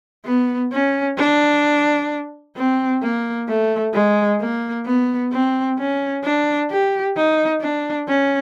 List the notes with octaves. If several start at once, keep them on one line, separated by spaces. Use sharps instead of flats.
B3
C#4
D4
C4
A#3
A3
G#3
A#3
B3
C4
C#4
D4
G4
D#4
D4
C#4